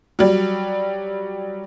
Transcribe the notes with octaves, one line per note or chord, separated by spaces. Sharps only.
F#3 G3